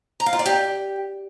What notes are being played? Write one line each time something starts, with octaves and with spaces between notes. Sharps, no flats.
A#5
F5
F4
D5
G4